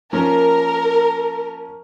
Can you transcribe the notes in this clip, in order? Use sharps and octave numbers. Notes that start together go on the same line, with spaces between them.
F3 A#3 C#4 A#4